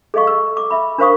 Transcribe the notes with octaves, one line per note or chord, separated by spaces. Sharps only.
G#4 A4 D#5 F5 C#6
E6
D6
E5 B5
D4 A#4 C5 F5 C#6 D#6